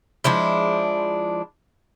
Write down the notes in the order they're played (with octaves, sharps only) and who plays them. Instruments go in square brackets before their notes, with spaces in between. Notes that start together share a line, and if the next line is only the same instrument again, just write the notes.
[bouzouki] F3 G#3 D4 E4